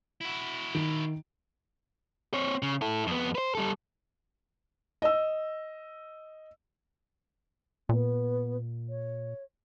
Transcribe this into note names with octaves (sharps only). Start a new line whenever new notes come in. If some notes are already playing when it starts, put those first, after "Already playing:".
E4 F#4
D#3 D7
C4 C#5
C#3
E4 A4
F2 B3
B4 C5
G3 A4
D#5 E6
A#2 B3
C#5